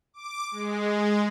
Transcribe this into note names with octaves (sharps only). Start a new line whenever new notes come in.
D6
G#3